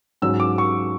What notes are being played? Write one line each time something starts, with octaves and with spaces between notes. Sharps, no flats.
G#2 F#3 C#4 E6
D6
C#6